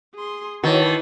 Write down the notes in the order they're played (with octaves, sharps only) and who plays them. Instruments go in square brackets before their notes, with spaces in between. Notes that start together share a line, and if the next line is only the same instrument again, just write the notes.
[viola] G#4 C6
[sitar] D#3 [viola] E3 A5 [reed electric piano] F#4 C#5